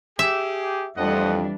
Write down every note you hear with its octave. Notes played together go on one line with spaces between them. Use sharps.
G4 G#4 E5
F2 E3 G3 A3 D4 D#5 F#5